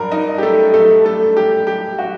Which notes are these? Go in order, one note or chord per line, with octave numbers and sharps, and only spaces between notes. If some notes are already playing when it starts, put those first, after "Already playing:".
Already playing: G2 F#3 A#4
D#4 D#5
G4
A3 A4
A3 A4
A3 A4
G4
G4
F#4